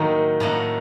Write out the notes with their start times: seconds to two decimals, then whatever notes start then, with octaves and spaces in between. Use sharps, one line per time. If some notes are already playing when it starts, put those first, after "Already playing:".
Already playing: A2 D#3 F#3 A#3 D#4 F#4
0.40 A2 F#3 A#3 D#4 F#4